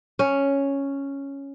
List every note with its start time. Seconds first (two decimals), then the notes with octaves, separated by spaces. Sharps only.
0.19 C#4